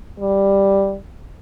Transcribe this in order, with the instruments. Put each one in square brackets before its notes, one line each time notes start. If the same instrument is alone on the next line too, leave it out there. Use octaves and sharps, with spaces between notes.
[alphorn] G3